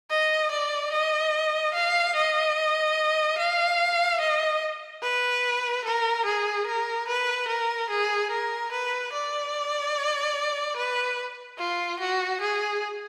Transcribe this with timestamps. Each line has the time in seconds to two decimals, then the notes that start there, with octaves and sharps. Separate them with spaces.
0.10 D#5
0.51 D5
0.92 D#5
1.74 F5
2.15 D#5
3.38 F5
4.20 D#5
5.03 B4
5.84 A#4
6.25 G#4
6.66 A#4
7.08 B4
7.48 A#4
7.90 G#4
8.31 A#4
8.72 B4
9.13 D5
10.77 B4
11.59 F4
12.00 F#4
12.41 G#4